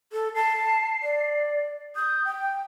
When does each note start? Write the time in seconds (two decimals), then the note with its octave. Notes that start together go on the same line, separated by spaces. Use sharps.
0.13 A4
0.35 A5 C7
1.03 D5
1.96 D#6 G6
2.25 G5